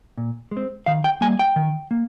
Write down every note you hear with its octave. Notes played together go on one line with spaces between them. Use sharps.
A#2
G#3
C4
D#3 F5
G5
G3 A#3 G#5
G5
D#3
A#3